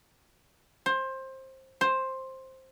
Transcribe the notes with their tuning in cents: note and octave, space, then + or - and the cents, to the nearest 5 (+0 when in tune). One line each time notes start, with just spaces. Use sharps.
C5 +20
C5 +10